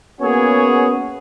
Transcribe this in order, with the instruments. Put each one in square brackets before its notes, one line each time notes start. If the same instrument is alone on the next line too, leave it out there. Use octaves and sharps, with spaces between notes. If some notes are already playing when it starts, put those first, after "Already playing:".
[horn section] A#3 B3 C#4 F#4 G#4 C#5